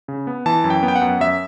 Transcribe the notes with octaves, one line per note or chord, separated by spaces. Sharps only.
C#3
B3
E3 A5
F#2
G5
B3
G5
F#5
F#2
F#2 E5